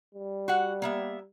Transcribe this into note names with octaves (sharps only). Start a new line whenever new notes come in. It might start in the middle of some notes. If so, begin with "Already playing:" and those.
G3
F#4 F#5
A#3 B3 E5